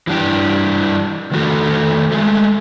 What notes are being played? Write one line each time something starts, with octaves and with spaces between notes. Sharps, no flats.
E3 G3 D4 G5
D#3 A3 F#4 A4
G#3 A3